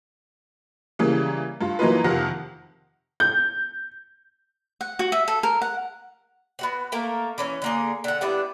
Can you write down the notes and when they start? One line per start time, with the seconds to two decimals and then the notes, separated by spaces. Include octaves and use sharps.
0.99 C#3 E3 G3 A#3
1.61 G2 F4
1.79 E3 F#3 A#3 D#4 F4 B4
2.04 F2 C3 D#3 F4 F#5 A#6
3.20 G6
4.81 F#5
4.99 F#4
5.12 E5
5.28 A4
5.43 A#4
5.62 F#5
6.59 B3 F#4 F#5
6.92 A3 A#3 A#4
7.38 E3 C#4 C#5
7.62 D3 A#3 G#4
8.04 D3 F#5
8.21 G3 B3 D4 E4